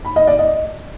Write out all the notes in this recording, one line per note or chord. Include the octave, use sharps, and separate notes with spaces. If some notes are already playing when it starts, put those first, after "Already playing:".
B5
D#5
D5
D#5